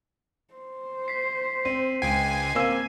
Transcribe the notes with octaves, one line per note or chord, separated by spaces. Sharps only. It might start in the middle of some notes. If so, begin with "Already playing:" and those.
C5
B6 C7
C4 D#7
C#2 G5 G#5 C7
A#3 C4 G#5 E6